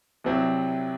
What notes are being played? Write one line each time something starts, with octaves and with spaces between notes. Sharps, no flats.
C2 C3 F#3 C4 E4